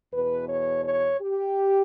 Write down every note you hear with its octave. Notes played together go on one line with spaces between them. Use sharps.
E2 B2 B4
C#5
C#5
G4